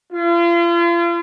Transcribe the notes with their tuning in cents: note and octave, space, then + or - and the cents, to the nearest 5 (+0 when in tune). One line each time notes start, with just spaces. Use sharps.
F4 -40